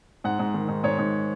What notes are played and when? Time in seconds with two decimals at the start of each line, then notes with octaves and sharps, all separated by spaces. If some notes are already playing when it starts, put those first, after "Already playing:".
0.24 G#2 F#5
0.39 G#2
0.54 D#3
0.68 G#2
0.84 G#2 C#5
0.99 G#2